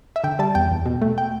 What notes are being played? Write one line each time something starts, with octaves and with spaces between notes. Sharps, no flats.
E5
D3 G5
G3 A5
E2 G5
E2
B2
A3
G5